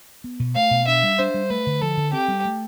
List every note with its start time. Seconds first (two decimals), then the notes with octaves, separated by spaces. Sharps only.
0.24 B3
0.40 B2
0.56 A3 F5
0.71 B2
0.87 D4 E5
1.03 G3
1.19 D4 C5
1.34 G3
1.50 A3 B4
1.66 D3
1.81 F3 A4
1.97 D3
2.13 C4 G4
2.28 G3
2.45 A3